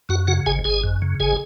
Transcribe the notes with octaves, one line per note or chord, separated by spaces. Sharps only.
F#2 F#4 F#5
C#3 F#4 F#5
G#1 G#4 G#5
G#1 G#4 G#5
F#2
C#3
G#1 G#4 G#5